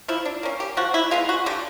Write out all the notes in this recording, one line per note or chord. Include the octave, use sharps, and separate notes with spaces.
F3 E4
D4
A#3 C#4
G4
F3 F#4
E4
G#3 B3 F4
F#4
D3 G4